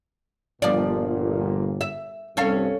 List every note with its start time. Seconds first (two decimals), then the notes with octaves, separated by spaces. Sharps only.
0.62 G1 A#2 F3 D5
1.81 E5
2.37 C2 G2 C#4 A4 F5